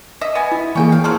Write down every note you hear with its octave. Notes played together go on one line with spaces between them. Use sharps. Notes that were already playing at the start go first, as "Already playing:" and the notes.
D#5 E5
B3 G#5
E4
E3 A#3 C#4 G#4 G5
F5
F3 F#3 C4 A5 F6